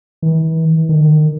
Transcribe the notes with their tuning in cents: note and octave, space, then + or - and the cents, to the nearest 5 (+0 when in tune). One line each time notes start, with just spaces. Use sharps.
E3 -35
D#3 -30